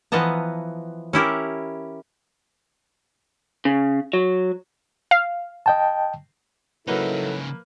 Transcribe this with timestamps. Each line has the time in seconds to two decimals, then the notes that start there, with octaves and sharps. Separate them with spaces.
0.12 E3 F3 B3 D#5 A5 A#5
1.13 C#4 E4 G4 A#4
3.65 C#3
4.13 F#3
5.11 F5
5.66 D#5 G5 A5
6.88 C#3 F#3 A#3 D#4 E4 A4 B4